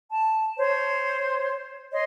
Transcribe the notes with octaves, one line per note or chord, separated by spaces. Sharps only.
A5
C5 C#5
C#5 D#5 C6